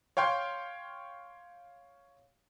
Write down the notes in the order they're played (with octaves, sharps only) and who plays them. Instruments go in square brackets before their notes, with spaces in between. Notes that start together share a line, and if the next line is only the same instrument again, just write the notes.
[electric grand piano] C#5 F5 G5 C6 G6